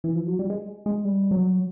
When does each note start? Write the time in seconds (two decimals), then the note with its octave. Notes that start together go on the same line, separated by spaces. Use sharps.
0.04 E3
0.15 F3
0.27 F#3
0.39 G3
0.50 G#3
0.86 G#3
1.05 G3
1.31 F#3